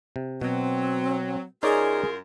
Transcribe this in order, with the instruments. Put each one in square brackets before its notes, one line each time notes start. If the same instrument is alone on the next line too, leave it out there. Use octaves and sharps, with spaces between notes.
[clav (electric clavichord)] C3
[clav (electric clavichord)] B2 [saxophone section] F#3 [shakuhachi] C4
[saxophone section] F#2 F4 A#4 [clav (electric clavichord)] D#4 C#5 D5 [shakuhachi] G#4